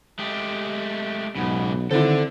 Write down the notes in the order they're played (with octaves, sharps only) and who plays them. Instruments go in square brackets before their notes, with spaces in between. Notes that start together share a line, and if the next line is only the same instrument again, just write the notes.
[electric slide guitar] G#3 A3 G4
[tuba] B1 [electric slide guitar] G#2 C#3 [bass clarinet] B3
[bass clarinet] D3 [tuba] D#3 [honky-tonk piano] C4 E4 [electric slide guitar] A4 D5